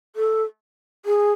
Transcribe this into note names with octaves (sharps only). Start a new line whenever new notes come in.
A4
G#4